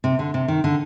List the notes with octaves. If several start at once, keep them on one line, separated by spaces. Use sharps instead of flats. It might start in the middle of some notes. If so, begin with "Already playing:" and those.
C3
D3
C3
D#3
D3